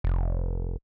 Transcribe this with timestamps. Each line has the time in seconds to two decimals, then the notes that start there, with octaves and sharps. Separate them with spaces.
0.04 F1